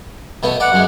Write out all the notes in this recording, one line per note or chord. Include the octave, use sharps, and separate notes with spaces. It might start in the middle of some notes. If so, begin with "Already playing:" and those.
B2 A3 B3
D5 F#5
F#2 G#3